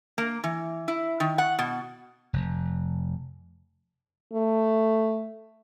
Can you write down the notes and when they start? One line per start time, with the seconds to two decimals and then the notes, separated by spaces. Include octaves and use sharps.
0.18 A#3
0.44 E3
0.88 E4
1.20 D#3
1.38 F#5
1.59 B2
2.33 F1
4.33 A3